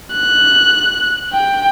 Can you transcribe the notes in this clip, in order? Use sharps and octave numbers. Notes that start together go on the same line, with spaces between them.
F#6
G5